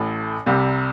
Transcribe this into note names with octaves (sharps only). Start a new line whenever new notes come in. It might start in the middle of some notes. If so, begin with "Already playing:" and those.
Already playing: A1 A2 A3
C2 C3 G3